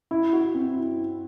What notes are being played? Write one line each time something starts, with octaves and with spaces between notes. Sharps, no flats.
E4
F#4
C4
E4